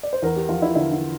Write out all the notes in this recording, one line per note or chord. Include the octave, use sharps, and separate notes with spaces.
D5
C5
E2 A#4
G4
F3 F4
E4
D3 E4
E4